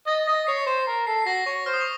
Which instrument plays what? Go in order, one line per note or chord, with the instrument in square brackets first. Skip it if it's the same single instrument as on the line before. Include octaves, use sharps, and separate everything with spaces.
[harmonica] D#5 [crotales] A6
[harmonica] D#5 [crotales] A#6
[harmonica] C#5 [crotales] C7
[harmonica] C5 [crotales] C7
[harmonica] A#4
[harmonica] A4 [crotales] C7
[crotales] C7
[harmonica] F#4 [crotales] A#6
[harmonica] C#5 [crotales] C#6
[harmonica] C5 [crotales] F6
[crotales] D#6
C#6